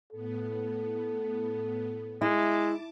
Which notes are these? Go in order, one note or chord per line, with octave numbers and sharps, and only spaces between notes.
A2 B3 A4
G#3 E4 A5 D6